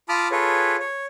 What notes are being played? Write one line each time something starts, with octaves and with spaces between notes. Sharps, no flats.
F4 A5 B5 D6 D#6 F6
F4 G#4 A4 B4 C#5
C#5